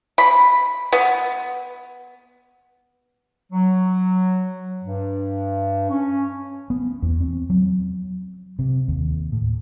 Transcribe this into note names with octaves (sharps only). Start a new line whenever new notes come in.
B5
B3
F#3
G2
C#4
B3
E2
C4
F#3
C3
D#2
A2